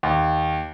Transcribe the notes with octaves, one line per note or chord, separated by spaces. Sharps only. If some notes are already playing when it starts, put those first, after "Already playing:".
D#2